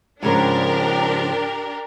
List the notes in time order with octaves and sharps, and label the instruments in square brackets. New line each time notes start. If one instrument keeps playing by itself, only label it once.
[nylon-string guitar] G#2 C#3 F3 [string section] D4 G4 A#4